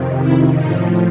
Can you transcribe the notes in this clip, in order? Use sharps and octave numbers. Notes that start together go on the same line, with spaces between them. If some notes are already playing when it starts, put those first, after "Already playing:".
Already playing: F2 C3 D#3
E4
A2 F3 D#4